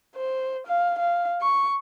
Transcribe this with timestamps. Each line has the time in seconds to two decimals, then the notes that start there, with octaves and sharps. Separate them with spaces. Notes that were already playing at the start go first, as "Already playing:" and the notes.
0.16 C5
0.67 F5
0.99 F5
1.41 C#6